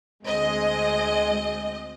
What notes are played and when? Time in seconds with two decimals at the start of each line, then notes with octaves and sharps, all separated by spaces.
0.22 D2 G#3 C4 D#5